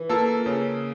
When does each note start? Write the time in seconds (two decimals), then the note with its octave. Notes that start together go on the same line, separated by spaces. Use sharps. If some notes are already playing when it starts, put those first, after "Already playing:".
Already playing: E3
0.09 A#3 F4 A4
0.46 C#3